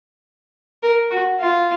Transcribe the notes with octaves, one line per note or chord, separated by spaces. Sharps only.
A#4
F#4
F4